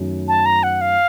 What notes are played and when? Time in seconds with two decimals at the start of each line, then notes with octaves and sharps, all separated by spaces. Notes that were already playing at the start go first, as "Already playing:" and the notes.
Already playing: F#2 D#3 A3 C#4
0.28 A5
0.46 A#5
0.63 F#5
0.81 F5